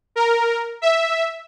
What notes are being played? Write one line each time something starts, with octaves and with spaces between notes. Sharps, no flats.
A#4
E5